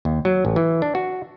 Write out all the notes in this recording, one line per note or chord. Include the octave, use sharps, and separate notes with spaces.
D#2
F#3
A1
E3
D4
F#4